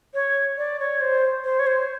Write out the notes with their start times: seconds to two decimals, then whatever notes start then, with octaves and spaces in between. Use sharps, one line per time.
0.14 C#5
0.58 D5
0.80 C#5
1.01 C5
1.44 C5
1.59 C#5
1.67 C5